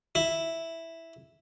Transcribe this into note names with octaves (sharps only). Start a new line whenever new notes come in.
E4